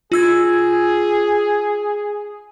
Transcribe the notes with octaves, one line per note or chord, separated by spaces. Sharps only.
F4 G#4 E6 G#6